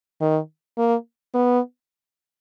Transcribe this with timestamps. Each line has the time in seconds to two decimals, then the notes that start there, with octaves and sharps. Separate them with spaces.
0.21 D#3
0.78 A#3
1.34 B3